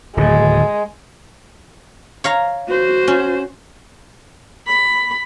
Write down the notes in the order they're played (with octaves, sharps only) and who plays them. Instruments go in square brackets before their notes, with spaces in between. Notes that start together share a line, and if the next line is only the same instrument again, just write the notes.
[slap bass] D1 D#2 A2 [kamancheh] G#3
[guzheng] C#5 F5 A#5
[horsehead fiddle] F#4 C5
[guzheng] C#4
[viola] B5